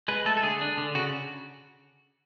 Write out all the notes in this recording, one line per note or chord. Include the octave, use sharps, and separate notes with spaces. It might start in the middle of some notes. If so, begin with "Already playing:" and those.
G#3 B4
A3 A4
A4
D3 G#4
D4
D3
C#3 F#4